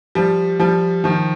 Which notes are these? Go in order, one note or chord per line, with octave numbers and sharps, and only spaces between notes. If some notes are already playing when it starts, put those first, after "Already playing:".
F3 G3
F3 G3
D#3 F3